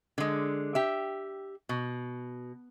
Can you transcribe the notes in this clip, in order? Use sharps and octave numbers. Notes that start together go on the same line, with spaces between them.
D3 G#3
G4 E5
B2